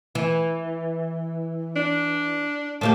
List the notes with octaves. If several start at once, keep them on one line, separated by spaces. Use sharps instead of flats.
E3
D4
A2 A#3 G4 A5